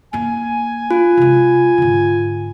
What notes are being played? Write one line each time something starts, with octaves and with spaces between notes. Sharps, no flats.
A#3 E4 G#5
F4
C3 G#3
G#2 D3